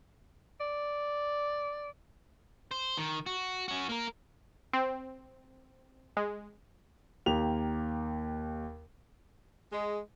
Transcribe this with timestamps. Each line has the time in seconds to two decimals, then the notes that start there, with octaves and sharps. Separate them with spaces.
0.60 D5
2.71 C5
2.97 D#3
3.26 F#4
3.68 C#4 F#4
3.89 A#3 A#4
4.73 C4
6.17 G#3
7.26 D#2 A#3 G4 F7
9.72 G#3